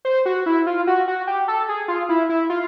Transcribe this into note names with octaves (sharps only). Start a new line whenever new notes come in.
C5
F#4
E4
F4
F#4
F#4
G4
A4
G#4
F4
E4
E4
F4